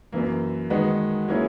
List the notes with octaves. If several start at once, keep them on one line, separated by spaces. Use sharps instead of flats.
F#2 E3 A#3
D#3 G#3 B3 F#4
F#3 A#3 C#4 E4 G#4